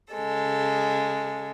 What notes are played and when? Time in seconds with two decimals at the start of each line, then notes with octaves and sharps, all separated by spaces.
0.13 C#3 G#3 A4